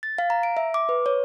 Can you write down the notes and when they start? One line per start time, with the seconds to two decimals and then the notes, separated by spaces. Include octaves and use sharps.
0.03 A6
0.18 F5
0.30 A#5
0.43 D7
0.57 E5
0.74 D6
0.89 B4
1.06 C#5